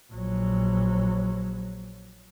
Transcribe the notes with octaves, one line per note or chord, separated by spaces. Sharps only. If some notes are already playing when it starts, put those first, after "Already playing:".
A#1 F#3